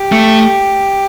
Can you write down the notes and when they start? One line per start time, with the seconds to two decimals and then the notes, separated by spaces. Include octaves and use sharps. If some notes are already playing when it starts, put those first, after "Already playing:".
Already playing: G4
0.12 A3